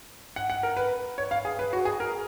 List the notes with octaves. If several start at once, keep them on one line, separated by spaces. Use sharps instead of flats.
F#5
F#5
A#4
B4
C#5
F5
G#4
B4
F#4
G#4
A#4